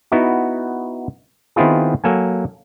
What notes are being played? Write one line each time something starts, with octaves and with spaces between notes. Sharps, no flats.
B3 D#4 E4 F#4
D#3 B3 C4 E4 F4 G#4
F#3 A#3 A4 G#5